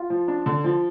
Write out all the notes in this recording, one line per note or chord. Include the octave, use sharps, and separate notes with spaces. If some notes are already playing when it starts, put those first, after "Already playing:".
Already playing: F4
F3
D4
D3
F3